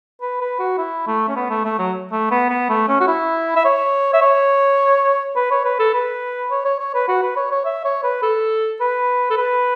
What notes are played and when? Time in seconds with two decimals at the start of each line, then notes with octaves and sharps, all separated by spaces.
0.21 B4
0.41 B4
0.59 F#4
0.78 E4
1.07 A3
1.28 C#4
1.36 B3
1.50 A3
1.65 A3
1.79 F#3
2.12 A3
2.31 B3
2.50 B3
2.70 A3
2.88 C#4
3.01 F#4
3.08 E4
3.56 E5
3.65 C#5
4.14 E5
4.21 C#5
5.36 B4
5.51 C#5
5.65 B4
5.79 A4
5.94 B4
6.51 C#5
6.65 C#5
6.80 C#5
6.94 B4
7.08 F#4
7.23 B4
7.36 C#5
7.51 C#5
7.65 E5
7.85 C#5
8.03 B4
8.23 A4
8.81 B4
9.30 A4
9.37 B4